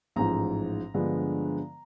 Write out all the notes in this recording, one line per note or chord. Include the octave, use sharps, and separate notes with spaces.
A1 G#2 F3 A#5
G2 D3 F3 G#3 B3